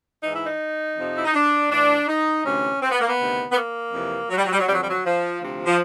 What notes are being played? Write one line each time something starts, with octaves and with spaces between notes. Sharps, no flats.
G#2 E3 D#4
E4
D#4
F2 C3 F3
E4
D#4
D4
A2 E3 D4
D#4
D2 C3 E3 C#4
C4
B3
A#3
B3
D2 C3 D#3
B3
A#3
F2 C3 E3
F#3
G3
F#3
G3
F#3
F2 D3 F3 G3
F#3
G3
F#3
F3
D2 C3 F3
F3